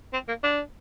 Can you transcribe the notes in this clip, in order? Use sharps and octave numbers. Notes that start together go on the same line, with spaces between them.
C4
A#3
D4